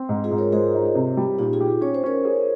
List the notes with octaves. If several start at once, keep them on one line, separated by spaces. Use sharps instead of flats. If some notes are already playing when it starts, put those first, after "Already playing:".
Already playing: C4
G#2
F4 G#4
G#2
A#4 C#5
G#3 G#4 C5
D#4
C3
G3
A#2 D#4 G4
F4 G#4
G4
C#4 C#5
C5
C#4 A#4 C#5
G#4